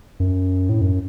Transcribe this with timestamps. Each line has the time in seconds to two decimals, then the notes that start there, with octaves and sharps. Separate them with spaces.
0.20 F#2
0.69 A2
0.81 F#2